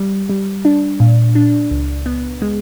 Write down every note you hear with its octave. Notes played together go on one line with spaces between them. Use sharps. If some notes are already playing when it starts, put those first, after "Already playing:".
Already playing: G3
G3
D4
A#2
D4
C#2
B3
G#3